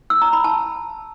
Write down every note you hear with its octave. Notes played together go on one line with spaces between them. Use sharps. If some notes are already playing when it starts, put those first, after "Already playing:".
E6
A#5
B5
A5